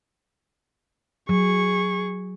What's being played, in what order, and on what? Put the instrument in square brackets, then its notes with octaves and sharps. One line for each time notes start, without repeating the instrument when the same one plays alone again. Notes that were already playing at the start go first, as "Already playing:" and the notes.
[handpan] F#3 [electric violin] G#4 C#6